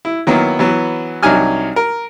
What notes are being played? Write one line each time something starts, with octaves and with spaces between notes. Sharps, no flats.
E4
D#3 F#3 A#3 B3 E4
E3 F#3 B3
C2 F#3 D4 D#4 G#5 F6
A#4